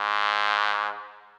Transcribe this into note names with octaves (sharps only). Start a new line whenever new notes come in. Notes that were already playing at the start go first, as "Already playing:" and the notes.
Already playing: G#2